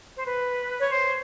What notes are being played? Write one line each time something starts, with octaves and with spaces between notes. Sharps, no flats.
C5
B4
C#5
C5